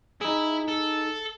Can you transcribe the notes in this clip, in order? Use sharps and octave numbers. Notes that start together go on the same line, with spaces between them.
D#4 E4 G#4
A4